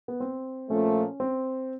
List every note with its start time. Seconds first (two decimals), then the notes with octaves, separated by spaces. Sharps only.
0.08 B3
0.20 C4
0.70 A#2 F3 A3 C#4
1.20 C4